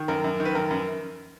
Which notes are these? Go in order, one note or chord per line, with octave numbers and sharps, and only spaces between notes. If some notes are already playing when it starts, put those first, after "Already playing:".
Already playing: D#3
F#2 A#4
F#2
D#3
B4
F#2 A#4
F#2